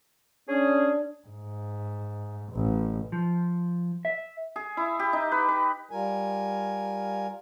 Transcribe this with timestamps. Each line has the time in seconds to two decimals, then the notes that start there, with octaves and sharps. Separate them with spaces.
0.49 C#4 D4 G#4
1.27 G#2
2.52 A1
3.12 F3
4.05 E5
4.56 G#4
4.77 E4
4.99 G4
5.13 D#4
5.32 B4
5.48 B4
5.91 G3 F4 A#4 G#5